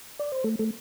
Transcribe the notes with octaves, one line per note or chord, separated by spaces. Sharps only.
D5
C5
A3 A4
A3 A4